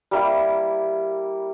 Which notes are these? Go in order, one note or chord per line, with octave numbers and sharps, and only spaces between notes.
G3 A#3 E4 G4